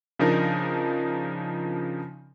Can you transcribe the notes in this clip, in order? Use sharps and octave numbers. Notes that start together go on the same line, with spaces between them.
C#3 F3 D4 D#4 A#4